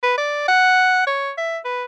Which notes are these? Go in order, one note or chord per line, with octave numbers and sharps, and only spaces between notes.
B4
D5
F#5
C#5
E5
B4